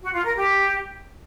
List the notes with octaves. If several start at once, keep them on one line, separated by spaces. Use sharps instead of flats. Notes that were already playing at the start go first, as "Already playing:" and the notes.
F#4
F4
A#4
G4